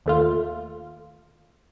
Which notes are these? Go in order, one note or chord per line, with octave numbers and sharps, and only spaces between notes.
D#2 A3 F4